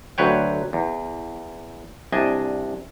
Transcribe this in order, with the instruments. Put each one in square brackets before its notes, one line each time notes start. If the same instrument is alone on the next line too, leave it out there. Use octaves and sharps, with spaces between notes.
[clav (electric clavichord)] D2 F#3 B4 C#5 G5
E2
C2 D4 D#5 G#5